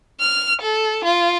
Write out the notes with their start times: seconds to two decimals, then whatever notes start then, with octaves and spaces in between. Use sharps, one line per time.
0.21 F6
0.62 A4
1.05 F4